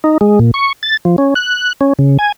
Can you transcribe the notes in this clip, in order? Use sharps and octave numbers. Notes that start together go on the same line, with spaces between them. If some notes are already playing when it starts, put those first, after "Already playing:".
D#4
G#3
A#2
C#6
A6
F3
C#4
F#6
C#4
C#3
G#5